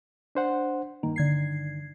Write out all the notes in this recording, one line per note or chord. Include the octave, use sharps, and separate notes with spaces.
D4 C5 F#5
G2 D#3 A#3
D3 G#6 C7